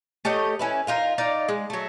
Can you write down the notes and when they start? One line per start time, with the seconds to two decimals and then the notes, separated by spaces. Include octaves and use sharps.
0.25 A3 G4 C#5 D#5
0.59 C#4 E4 B4
0.87 D#4 F4 A#4
1.18 D#4 D5 F5
1.49 G#3
1.70 F#3 A3